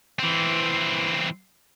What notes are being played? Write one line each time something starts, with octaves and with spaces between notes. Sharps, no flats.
E3 C4